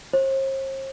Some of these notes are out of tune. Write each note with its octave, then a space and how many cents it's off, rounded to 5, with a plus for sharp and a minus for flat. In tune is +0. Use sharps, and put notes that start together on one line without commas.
C5 +45